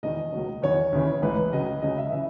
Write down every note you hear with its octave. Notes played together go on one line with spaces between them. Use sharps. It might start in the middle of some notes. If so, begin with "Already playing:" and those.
E1 E2 D#3 D#5
C#2 B2 F#3
E2 D#3 F#3 C#5
D#2 C#3 E3
A1 G#2 E3 B4
C#2 C#3 F#3 D#5
C#2 C#3 F#3 D#5
E5
C#3 E3 E5